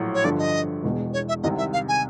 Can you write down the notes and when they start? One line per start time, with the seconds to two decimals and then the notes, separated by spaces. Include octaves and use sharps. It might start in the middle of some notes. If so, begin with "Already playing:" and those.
Already playing: A#1 A2 F#3
0.15 C#5
0.24 G2 D3 F3 D5
0.39 D#5
0.83 E1 E2 B2
1.13 C#5
1.29 E5
1.43 C2 C3 D#3 D#5
1.58 E5
1.73 F5
1.88 G#5